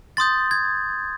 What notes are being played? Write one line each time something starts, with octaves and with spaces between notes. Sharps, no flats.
C6 D#6 G6 A6
G#6